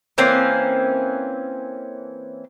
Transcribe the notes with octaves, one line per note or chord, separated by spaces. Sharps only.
E3 A#3 C4 C#4